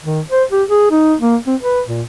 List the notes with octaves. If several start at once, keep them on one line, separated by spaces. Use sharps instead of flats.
D#3
C5
G4
G#4
D#4
A#3
C4
B4
A#2